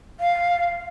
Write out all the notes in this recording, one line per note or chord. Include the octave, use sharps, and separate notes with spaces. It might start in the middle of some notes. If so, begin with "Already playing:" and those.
F5